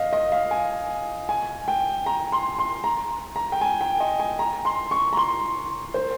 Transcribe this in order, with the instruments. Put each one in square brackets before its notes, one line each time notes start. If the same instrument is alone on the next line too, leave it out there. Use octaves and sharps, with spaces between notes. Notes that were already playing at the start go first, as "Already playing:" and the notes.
Already playing: [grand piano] D#5 F5
D#5
F5
G#5
G#5
G5
A#5
C6
C6
A#5
A#5
G5
G#5
G5
D#5
G#5
A#5
C6
C#6
A#5
C6
C5